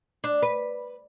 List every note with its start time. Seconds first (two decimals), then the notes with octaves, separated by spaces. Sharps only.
0.24 D4
0.42 B4